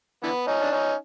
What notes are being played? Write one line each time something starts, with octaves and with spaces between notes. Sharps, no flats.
D3 E3 B3
C#4 D#4
D4
C#4 D#4